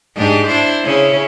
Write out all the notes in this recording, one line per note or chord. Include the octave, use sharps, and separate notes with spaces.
G#2 D4 G4
D4 E4 C5
C#3 C#4 E4